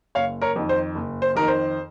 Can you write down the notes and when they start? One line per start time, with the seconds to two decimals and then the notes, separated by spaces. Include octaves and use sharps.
0.15 F#1 C#5 F5
0.42 A#4 C#5
0.56 F2 D#3
0.69 C5
0.95 F#1
1.22 C5
1.35 F2 D#3 A#4
1.48 C5